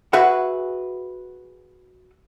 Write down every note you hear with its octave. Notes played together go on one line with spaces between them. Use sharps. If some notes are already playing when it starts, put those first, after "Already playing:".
F#4 G#4 B4 E5 F#5